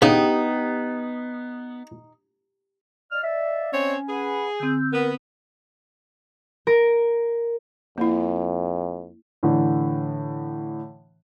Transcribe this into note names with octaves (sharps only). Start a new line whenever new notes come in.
C#3 B3 D#4 G4
D5 D#5 F5 F6
E5
C4 C#4 C#5
G#4 B4 F#5 B5
D3 C4 E6 G6
B3 A#4 B4
A#4
F2 A#3 E4
A2 D3 E3